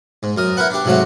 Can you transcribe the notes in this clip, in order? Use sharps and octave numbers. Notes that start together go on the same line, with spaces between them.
G#2
F#2 A#4 D#6
E4 A#4 B4 F#5
D4 G4
G#2 C3 F#3 A3 F#4